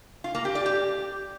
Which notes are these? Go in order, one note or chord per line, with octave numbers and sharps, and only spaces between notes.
F4
A#3
G4
D5
G4